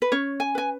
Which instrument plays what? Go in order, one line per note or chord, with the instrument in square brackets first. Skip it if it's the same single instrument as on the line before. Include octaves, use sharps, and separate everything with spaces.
[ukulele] B4
C#4 C#5
G#5
B4 G#5